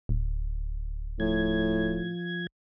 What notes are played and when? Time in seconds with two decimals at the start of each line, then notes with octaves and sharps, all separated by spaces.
0.09 D1
1.20 A2 F3 G#6